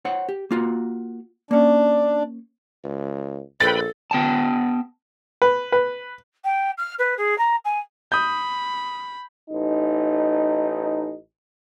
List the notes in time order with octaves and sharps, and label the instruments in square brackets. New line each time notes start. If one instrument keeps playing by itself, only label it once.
[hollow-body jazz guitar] C5 C#5 F#5
G4
A#3 F4 F#4
[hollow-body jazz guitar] A#3 C#4 [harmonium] D4
[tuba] C#2
[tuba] A#1 [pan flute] A4 [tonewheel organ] B4 G5 B5 [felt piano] A6
[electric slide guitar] B3 G5 A5
[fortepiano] B4
B4
[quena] G5
F6
B4
G#4
A#5
G#5
[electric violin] B5 [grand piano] D#6 G6
[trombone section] A1 D#4